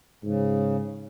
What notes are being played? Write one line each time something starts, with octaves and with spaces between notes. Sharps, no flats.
G#2 C#3